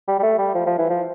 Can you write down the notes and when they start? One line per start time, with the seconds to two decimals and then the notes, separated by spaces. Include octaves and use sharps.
0.08 G3
0.19 G3
0.23 A3
0.38 G3
0.54 F3
0.66 F3
0.78 E3
0.89 F3